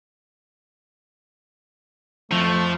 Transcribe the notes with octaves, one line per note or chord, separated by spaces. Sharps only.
F2 F3 A3